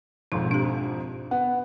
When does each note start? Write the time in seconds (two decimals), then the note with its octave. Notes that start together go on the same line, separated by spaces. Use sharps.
0.32 G#1 F2 G#2 B2 D#4
0.51 D4 G4
1.31 B3 F#5